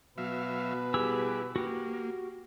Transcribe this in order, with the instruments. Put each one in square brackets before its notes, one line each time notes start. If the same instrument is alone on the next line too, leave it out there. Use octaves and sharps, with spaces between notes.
[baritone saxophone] B2 [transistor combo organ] F#3 E5 F5 [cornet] B4
[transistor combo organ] G3 E4 [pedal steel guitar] G4 G#4 E6
[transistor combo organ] A#3 [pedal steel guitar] F#4 G4